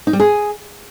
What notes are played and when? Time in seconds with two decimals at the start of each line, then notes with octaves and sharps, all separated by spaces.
0.07 D#4
0.13 G3
0.20 G#4